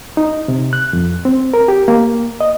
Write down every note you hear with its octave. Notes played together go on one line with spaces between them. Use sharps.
D#4
C3
F#6
F2
C4
A#4
G4
A#3
D#5